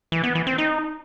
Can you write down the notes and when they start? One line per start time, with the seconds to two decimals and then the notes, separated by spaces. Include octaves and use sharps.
0.12 E3
0.24 B3
0.35 E3
0.47 C4
0.58 D#4